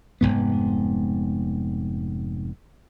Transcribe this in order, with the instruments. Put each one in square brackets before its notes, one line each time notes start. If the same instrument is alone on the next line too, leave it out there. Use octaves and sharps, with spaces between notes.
[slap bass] F1 F2 G#2 B3